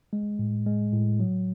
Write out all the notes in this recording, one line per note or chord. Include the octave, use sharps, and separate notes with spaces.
G#3
A2
G#3
A2
F#3